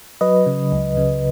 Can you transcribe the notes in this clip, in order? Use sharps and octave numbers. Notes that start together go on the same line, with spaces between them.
F#3 B4 D#5
C#3
C#2
C#3